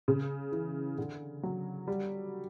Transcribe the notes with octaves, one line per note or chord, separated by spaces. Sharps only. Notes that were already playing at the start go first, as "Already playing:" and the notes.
C#3
E3
D3
F#3
G3